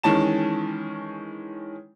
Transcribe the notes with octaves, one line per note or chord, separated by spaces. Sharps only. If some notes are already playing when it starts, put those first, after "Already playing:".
D#3 E3 G#3 C#4 A5 E7